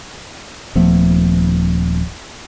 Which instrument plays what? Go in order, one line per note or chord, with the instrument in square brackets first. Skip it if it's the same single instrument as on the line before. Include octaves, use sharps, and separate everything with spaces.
[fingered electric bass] D#1 F3 A3 B3